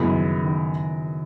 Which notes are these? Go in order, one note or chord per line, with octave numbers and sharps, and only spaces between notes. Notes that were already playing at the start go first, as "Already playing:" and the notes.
Already playing: F#2 C#3 E3 G#3 B3
D#3
D#3